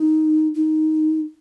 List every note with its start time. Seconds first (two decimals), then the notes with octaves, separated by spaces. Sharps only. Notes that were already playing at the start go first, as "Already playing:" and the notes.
Already playing: D#4
0.55 D#4